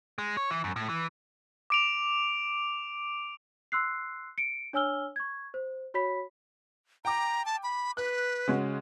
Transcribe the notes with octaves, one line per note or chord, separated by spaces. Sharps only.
G#3
C#5
E3
F#2
A2
E3
D6 D7 F7
C6 E6 F#6 C7
C#7 D7
D4 C#5 G#5 E6 F6 G7
C#6 G#6
C5
F#4 C#5 B5 B6
G5 A#5 D6
A5
B5
B4 F#6
C#3 G#3 F#4